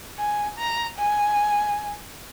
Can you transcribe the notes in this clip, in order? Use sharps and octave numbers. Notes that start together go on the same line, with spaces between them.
G#5
A#5
G#5